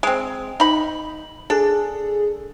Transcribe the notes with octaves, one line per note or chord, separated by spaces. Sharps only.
G#3 C4
D#4 B5
D4 G#4 A4